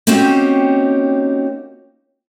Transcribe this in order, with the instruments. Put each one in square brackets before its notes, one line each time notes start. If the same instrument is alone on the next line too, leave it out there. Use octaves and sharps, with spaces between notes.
[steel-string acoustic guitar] A#3 C4 C#4 D#4 F#4 G4